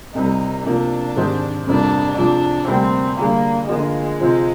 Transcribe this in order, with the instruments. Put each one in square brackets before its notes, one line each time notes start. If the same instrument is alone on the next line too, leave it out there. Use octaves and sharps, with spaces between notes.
[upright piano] C2 C3 G3 [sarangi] D#4
[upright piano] C3 F3 A#3 [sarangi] D4
[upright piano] G#2 D#3 G#3 C4 G4
[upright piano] F2 C3 G3 A#3 [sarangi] D4
[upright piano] C3 F3 G#3 [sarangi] D4
[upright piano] D2 C3 G3 A#3 [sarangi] C4
[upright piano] D3 G3 D4 G#4 [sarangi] A#3
[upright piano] D3 F3 A#3 F4 [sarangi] G#3
[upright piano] C3 F3 C4 F4